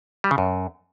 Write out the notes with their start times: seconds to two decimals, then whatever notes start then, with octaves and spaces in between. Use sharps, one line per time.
0.24 G3
0.31 C#3
0.38 F#2